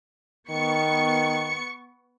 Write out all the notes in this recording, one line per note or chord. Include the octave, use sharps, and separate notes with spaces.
D#3 B3 C#6 C#7